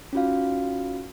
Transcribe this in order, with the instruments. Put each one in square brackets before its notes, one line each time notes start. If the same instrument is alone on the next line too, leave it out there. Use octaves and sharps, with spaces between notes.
[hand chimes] C#4 D#4 F4 F#4 F5